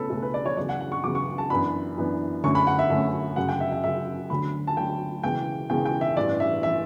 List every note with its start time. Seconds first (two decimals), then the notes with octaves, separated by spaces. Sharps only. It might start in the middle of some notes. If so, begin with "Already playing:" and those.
Already playing: C#2 B2 A3 C#4 A4 B4
0.10 C#2 B2 A3 C#4 A4
0.22 B4
0.34 D5
0.46 C#5
0.57 E2 C#3 F#3 D5
0.69 F#5
0.80 F#5
0.92 C#6
1.04 E2 C#3 F#3 D6
1.15 C#6
1.38 A5
1.50 F#2 E3 B3 D4 B5
1.97 F#2 E3 B3 D4
2.44 F#2 D3 A3 C#4 C#6
2.55 B5
2.67 F#5
2.79 E5
2.90 F#2 D3 A3 C#4 E5
3.36 F#2 C#3 F#3 F#5
3.49 G5
3.61 E5
3.72 E5
3.84 F#2 C#3 F#3 E5
4.30 D2 D3 F#3 B5
4.67 A5
4.77 D2 D3 F#3 G5
5.23 E1 E2 C#3 E3 G5
5.70 E1 E2 C#3 E3 G5
5.85 G5
6.01 E5
6.17 A1 G2 E3 D5
6.40 E5
6.63 E3 E5